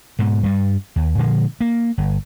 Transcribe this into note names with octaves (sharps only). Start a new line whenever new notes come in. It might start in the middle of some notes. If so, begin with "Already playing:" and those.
G#2 B2
G2 G3
D#2
A#2 D3 F3 G#3
A#3
G1